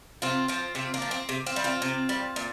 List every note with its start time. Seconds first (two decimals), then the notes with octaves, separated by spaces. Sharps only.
0.22 C3 C4 F4
0.48 F3 C4 F4
0.75 C3 C4 F4
0.94 A#3 D4
1.02 F3
1.11 C4
1.29 C3
1.46 C4 F4
1.56 G3
1.64 C4 F4
1.82 C3
2.09 G3
2.36 A#2